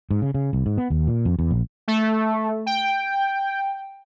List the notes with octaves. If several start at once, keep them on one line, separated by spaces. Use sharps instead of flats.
G#2
C#3
C#3
C2
G#2
B3
D#2
A#2
F2
E2
A#1
A3
G5